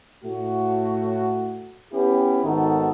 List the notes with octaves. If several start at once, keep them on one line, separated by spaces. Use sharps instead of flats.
A2 A3 F#4
B3 C#4 E4 G4
G#1 D#3 B3 D#4 F#4 A4